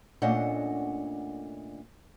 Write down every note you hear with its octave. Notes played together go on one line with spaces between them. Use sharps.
A#2 A3 C#4 D4 D#5 F#5